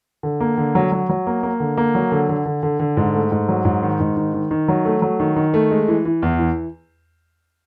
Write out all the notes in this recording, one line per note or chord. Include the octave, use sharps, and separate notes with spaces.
D3
A#3
D3
F#3
F#3
F#3
A#3
A#3
D3
A#3
F#3
D3
D3
D3
D3
D3
G#2
A3
G#2
F#3
G#2
D#3
G#2
D#3
D#3
D#3
F#3
A3
F#3
D#3
D#3
A3
G#3
E3
E3
E2
E3